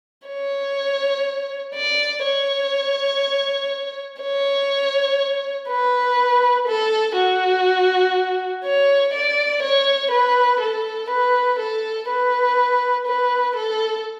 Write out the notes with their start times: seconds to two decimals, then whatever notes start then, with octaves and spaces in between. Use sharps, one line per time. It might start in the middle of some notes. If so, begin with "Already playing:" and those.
0.28 C#5
1.75 D5
2.24 C#5
4.21 C#5
5.68 B4
6.67 A4
7.16 F#4
8.65 C#5
9.13 D5
9.63 C#5
10.11 B4
10.60 A4
11.10 B4
11.59 A4
12.08 B4
13.07 B4
13.56 A4